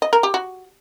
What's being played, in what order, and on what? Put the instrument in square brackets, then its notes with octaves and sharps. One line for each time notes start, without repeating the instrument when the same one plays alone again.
[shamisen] D#5
A#4
G4
F#4